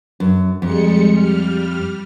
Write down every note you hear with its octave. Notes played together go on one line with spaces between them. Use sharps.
F#2
F2 G3 G#3 C#7
G3 F6